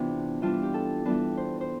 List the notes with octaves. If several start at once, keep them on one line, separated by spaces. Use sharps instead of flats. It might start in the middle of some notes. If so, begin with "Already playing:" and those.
Already playing: C3 E3 B3 D4 F4
E3 G3 D4 F4
G4
A4
E3 G3 B3 D4 B4
C5
C5